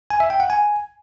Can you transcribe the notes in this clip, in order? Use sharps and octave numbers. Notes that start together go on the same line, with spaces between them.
G#5
E5
G5
F#5
G#5